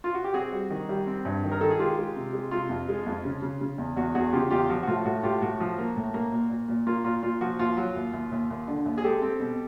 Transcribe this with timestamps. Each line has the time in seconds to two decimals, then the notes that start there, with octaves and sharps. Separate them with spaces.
0.04 F4
0.14 F#4
0.24 G4
0.34 C4 F#4 G#4
0.52 G3
0.70 D#3
0.89 G3
1.07 C4
1.25 G2
1.43 D#3
1.52 A#4
1.61 D#3 A4
1.70 G#4
1.79 G#3 F4 G4
1.97 G#3
2.16 C3
2.33 G#3
2.51 C3 F4
2.69 F2
2.89 G#3
3.06 F2
3.25 C#3
3.42 C#3
3.61 C#3
3.78 E2
3.96 E2 F#4
4.15 E2 F#4 G#4
4.33 C#3 F4 G4
4.50 E2 F4 G4
4.69 F3 F#4
4.83 F#4
4.87 A2 F4
5.05 A2 F#4
5.23 A2 F4 G4
5.42 A2 F#4
5.60 F3
5.78 A#3
5.96 A2
6.14 A#3
6.32 A#2
6.50 A#2
6.68 A#2
6.87 A#3 F4
7.04 A#2 F4
7.23 A#2 F4
7.41 F3 F#4
7.59 D#2 F4
7.77 F#3
7.96 D#2
8.13 D#2
8.32 D#2
8.50 D#2
8.68 D3
8.85 D#2
8.98 G#4
9.04 G#3 G4 A4
9.22 C4
9.40 B2